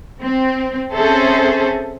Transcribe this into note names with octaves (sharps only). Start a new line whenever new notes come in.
C4
C4 C#4 G#4 A4 C5 E5